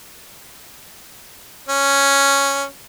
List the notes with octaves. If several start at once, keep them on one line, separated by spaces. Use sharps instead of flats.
C#4